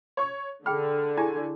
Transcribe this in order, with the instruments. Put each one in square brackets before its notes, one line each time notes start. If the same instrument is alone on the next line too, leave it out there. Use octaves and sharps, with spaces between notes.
[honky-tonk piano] C#5 C#6
[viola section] D3 [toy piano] G#4 G5 B5 [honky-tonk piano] F6
[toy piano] E4 G4 G#4 [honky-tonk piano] G#5